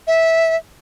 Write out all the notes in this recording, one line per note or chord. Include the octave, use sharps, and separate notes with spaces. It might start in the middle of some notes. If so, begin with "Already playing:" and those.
E5